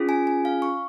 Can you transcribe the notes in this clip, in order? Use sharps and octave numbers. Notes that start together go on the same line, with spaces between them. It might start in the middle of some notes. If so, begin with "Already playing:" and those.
Already playing: C#4 F4 G#4
G#5
G#5
F5
C#6